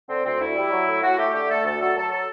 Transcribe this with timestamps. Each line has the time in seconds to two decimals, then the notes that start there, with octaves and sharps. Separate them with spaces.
0.08 D3 C4
0.24 D2 C4
0.39 D2 E4
0.56 G3
0.72 F#3
0.87 A2
1.02 A2 F#4
1.18 A3 G4
1.33 D3 G4
1.50 A3 A4
1.64 D2 A4
1.80 F#3 A4
1.96 F#3 A4
2.12 A4